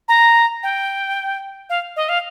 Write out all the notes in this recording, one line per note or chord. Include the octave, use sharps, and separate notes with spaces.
A#5
G5
F5
D#5
F5